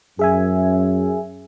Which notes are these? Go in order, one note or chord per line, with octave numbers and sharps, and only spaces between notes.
F#2 G#4 E5 G#5